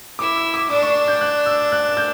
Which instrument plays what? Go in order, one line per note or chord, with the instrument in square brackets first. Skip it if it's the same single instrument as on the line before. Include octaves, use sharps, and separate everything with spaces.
[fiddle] E4 [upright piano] D6
[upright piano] E6
D6
[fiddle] D4 [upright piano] D6
[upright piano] C#6
G6
F#6
E6
F#6
G6